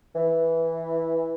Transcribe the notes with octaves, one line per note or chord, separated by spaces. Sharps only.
E3